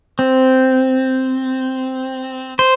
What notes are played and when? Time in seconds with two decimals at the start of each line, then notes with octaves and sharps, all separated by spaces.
0.19 C4
2.59 C5